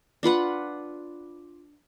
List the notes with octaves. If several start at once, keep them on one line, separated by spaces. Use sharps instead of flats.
D4 F4 B4 F#5